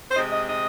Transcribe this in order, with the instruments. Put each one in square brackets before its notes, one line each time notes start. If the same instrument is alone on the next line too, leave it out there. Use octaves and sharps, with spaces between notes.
[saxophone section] C5
C3 G#3 D#5
D#5
D#5